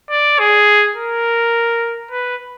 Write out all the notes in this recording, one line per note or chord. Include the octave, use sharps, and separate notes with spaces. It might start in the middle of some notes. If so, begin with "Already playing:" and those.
D5
G#4
A#4
B4